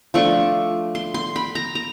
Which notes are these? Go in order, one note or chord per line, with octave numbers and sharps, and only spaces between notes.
F3 A3 D4 C#6
C6
C6
B5
A#5
A#5